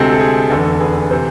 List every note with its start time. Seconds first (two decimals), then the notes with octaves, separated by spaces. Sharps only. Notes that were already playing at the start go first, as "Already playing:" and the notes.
Already playing: D2 C3 G#3 C4 A4
0.12 A4
0.20 G#4
0.50 F1 E2 D3 A4
0.80 G#4 B4
1.11 C3 E3 A4 C5